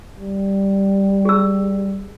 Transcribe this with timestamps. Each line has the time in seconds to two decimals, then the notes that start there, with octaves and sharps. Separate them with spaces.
0.15 G3
1.25 G#4 E6